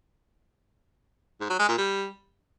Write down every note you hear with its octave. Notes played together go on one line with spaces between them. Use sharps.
G#2
F#3
G#3
A#2
G3